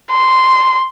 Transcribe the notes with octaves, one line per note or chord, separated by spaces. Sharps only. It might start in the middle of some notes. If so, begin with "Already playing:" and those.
C6